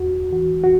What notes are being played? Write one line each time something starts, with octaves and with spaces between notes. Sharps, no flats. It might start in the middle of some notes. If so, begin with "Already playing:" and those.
Already playing: E2 F#4
E3 F#4
F#4